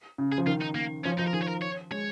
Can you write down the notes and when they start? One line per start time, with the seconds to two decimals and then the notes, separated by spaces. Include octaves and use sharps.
0.18 C#3
0.32 G#4
0.38 F3
0.47 D#3 F4
0.62 D#4
0.75 A#3
1.05 F3 C#4
1.19 F3 D#4
1.28 A#4
1.33 D#3 G#4
1.43 C#5
1.48 A#4
1.62 C#5
1.91 G#3 C#5